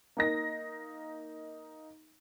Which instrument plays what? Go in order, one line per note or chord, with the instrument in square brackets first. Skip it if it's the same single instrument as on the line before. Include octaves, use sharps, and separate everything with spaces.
[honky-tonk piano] A#3 D#4 A#6